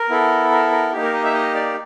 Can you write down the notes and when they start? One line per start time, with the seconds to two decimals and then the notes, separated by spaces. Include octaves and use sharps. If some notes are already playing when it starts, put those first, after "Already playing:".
Already playing: A#4
0.09 B3 E4 A4
0.51 A#4
0.71 A#4
0.93 A#3 D#4 G4
1.03 A#4
1.13 D#5
1.24 E5
1.34 D#5
1.55 D5